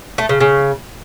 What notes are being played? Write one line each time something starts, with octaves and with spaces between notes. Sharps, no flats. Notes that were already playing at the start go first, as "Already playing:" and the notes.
A3
C#3
C#3